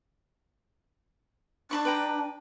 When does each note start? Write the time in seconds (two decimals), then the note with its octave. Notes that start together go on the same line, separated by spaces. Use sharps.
1.71 D4 A5 B5 C#6
1.85 B4 G5 A#5